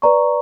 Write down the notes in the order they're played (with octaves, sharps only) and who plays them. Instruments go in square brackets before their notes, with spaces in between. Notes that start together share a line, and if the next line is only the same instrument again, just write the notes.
[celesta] B4 D5 A#5 C#6